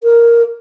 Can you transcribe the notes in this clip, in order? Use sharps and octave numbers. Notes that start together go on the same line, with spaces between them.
A#4